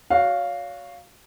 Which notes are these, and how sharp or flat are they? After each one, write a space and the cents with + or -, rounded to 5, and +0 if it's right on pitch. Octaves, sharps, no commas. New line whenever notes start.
F#4 -10 C#5 +35 F5 +0